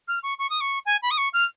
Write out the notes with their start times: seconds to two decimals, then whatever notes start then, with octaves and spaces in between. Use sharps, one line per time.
0.08 F6
0.23 C#6
0.39 C#6
0.50 D#6
0.61 C#6
0.86 G#5
1.02 B5
1.11 D#6
1.18 C#6
1.33 F6